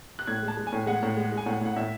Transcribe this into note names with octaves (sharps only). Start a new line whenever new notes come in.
F#6
A2 G#6
G#3
A5
G#3
G#5
A2
G#3 F#5
A2
G#3
G#3
G#5
A2 F#5
A2 F#5
A2 E5